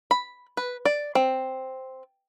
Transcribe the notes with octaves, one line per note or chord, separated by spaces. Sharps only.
B5
B4
D5
C4